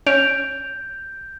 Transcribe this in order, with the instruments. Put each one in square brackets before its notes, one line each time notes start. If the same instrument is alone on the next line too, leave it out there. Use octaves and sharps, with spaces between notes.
[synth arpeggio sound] C#4 [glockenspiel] G6 [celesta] D7 F7